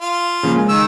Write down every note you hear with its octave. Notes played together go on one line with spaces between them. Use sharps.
F4
C#3 F3 A#3
G#3 G#5
D#3 E6